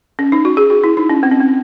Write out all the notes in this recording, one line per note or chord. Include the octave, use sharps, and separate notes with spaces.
C#4
D#4
F#4
G#4
F#4
E4
D#4
C#4
C4
C#4
C4